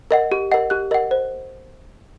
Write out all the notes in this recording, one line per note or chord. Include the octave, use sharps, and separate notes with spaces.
A#4 D#5 F#5
G4
A#4 D#5 F#5
G4 F#6
A#4 D#5 F#5
C5